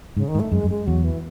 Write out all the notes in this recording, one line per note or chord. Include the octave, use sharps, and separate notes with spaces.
G#2 C#3
D#3
G#2
A3
F#2 G#3
F#2
G#3
E2 F#3
E3